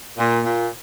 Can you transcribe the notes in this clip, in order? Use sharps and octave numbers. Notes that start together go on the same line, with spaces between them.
A#2
A#2